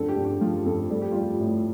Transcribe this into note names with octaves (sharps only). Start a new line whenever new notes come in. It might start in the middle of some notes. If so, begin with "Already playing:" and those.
Already playing: F2 D3 A4
G4
D3
G4
F3 F4
F2 A4
G3 A4
G4
G3 F4
G4
A2